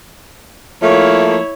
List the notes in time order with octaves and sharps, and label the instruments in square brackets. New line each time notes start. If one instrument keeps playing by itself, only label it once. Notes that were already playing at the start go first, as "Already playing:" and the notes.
[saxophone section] F3 A3 A#3 [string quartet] E4 C#5